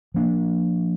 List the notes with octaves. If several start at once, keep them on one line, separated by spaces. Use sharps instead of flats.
F3 A#3 D4